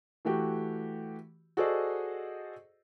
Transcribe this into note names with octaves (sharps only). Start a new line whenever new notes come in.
E3 A3 F#4 G4
F#4 G#4 A4 C5 D5 D#5